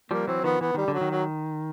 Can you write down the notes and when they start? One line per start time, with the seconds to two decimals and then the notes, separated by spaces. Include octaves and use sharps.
0.11 F3 G3 A#3
0.27 E3 F#3 C4
0.44 D#3 F3 B3
0.61 E3 B3
0.74 D#3 G3
0.88 D3
0.94 F#3
1.01 D#3
1.11 F#3